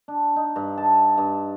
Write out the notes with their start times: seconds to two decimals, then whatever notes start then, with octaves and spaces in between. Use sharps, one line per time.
0.08 D4
0.36 D#4
0.56 G2
0.78 A5
1.18 G2